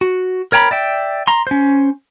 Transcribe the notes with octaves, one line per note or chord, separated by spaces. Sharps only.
F#4
A#4 C#5 G5 A#5 B5
D5 E5 G5
A#5 C6
C#4 C5